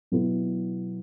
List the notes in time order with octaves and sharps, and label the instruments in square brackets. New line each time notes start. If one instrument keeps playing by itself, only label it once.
[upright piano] B2 F#3 B3 E4